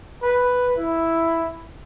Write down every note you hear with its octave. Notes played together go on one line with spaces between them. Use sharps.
B4
E4